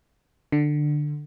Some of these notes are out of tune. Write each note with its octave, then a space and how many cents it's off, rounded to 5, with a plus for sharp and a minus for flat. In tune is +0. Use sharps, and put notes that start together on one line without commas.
D3 +15